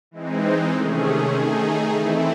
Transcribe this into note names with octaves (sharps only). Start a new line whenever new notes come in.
E3 G#3 C4 D#4
C3 D#3 A3 C#4 G#4
D#3 A3 D#4 G#4
E3 A3 C4 E4